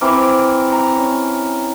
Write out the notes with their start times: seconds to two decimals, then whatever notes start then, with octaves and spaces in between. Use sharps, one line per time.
0.01 E3 C4 A#4 D6
0.72 A#5
0.97 C#4